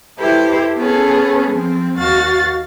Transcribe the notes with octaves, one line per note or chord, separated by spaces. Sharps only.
E4 G4 A4 B4 C5
B3 C#4 G#4 A4
F3 C4
D#2 F#4 F5 A6